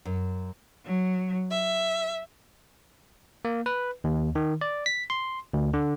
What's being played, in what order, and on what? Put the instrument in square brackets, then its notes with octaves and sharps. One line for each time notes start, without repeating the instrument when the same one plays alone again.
[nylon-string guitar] F#2
[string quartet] F#3
E5
[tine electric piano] A#3
B4
D#2
D#3
D5
B6
C6
D2
D3